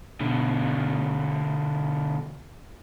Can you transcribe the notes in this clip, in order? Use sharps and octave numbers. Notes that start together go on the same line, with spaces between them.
B2 D3